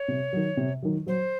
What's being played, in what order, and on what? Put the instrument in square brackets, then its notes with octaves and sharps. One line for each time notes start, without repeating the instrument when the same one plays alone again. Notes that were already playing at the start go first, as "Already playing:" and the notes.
Already playing: [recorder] C#5
[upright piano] C3
D#3 F#3
C3
D#3 F#3
[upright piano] F#3 [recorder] C5